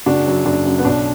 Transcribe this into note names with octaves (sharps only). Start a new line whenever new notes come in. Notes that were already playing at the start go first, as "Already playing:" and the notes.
F#1 D4 F#4
F#2 F#3
F#1 D4
F#2 F#3
B3
B1 D4